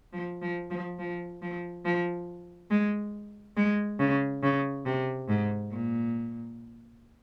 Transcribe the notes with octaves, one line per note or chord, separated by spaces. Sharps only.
F3
F3
F3
F3
F3
F3
G#3
G#3
C#3
C#3
C3
G#2
A#2